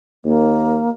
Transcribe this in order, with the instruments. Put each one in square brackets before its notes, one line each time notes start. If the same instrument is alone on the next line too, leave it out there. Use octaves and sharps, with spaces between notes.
[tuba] D#2 [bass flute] A#3